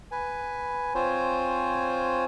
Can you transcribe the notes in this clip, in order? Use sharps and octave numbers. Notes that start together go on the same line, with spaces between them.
B4 G#5
C4 F4 C5 C#5 G#5